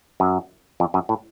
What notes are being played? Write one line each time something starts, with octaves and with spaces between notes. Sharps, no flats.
F#2
F2
F#2
A2